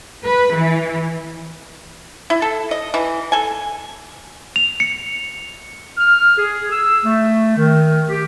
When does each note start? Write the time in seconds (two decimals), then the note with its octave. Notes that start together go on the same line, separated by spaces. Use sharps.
0.24 B4
0.57 E3
2.30 E4
2.42 A4
2.71 D#5
2.94 E3
3.32 A4 G#5
4.56 F7
4.80 C#7
5.98 F6
6.37 G#4
6.72 E6
7.05 A3
7.57 D#3
8.09 G4